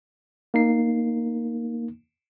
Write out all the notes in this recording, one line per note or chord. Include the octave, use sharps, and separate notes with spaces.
A#3 D#4 C7